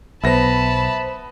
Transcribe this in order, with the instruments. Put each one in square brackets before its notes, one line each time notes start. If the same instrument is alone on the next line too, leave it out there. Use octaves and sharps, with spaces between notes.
[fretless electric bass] B1 [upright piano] B3 A#6 [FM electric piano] C5 E5 [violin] A5 B5